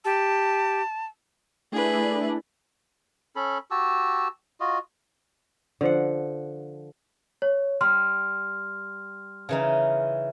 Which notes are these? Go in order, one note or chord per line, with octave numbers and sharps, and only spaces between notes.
G4 A5
A3 D4 E4 G#4 B4
C#4 A4 B5
F#4 G4 A5 E6
F4 F#4 D#5
D3 F3 F#5
C#5
G3 C6 F6
C#3 E3 D#4